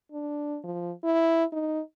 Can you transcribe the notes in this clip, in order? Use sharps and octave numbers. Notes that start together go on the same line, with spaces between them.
D4
F3
E4
D#4